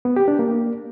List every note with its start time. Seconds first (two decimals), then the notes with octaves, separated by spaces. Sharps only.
0.05 B3
0.16 G4
0.28 D4
0.39 A#3